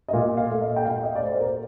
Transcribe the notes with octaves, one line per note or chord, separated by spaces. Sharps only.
D#5
A#2 F5
F5
A3
D#5
G5
A#2 F5
D#5
D5
A3 C5
C5
A#4